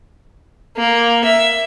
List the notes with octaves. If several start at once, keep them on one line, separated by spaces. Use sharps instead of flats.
A#3
E5